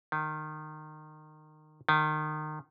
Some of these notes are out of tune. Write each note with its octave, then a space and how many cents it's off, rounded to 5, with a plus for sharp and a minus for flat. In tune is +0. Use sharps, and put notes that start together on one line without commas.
D#3 -20
D#3 -25